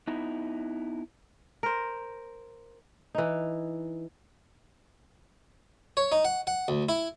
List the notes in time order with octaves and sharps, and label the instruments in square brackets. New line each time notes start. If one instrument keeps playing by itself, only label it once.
[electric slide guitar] B3 D#4 E4
[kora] A#4 C5
E3 D#4
[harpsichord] C#5
D#4
F#5
F#5
D2
E4